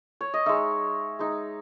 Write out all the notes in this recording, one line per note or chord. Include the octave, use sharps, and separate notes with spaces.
C#5
D#5
G#3 D#4 C#5 E5
G#3 D#4